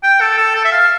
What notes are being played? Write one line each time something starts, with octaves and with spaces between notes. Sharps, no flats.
G5
A4
A4
A4
E5
F5